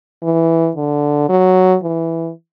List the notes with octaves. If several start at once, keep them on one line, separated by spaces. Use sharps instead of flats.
E3
D3
F#3
E3